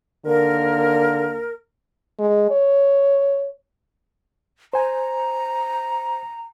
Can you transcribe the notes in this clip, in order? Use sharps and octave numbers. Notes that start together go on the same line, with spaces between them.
D#2 D3 A#3 A#4
G#3
C#5
C5 G#5 A#5